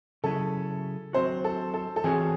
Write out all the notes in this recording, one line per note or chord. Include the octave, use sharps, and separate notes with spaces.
C#3 F#3 C#4 E4 G#4 A4
F#3 C4 F#4 C5
A4
A4
A4
E3 C4 F#4 G#4 C#5